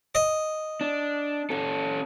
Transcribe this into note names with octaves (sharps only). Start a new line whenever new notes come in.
D#5
D4
C#4 A4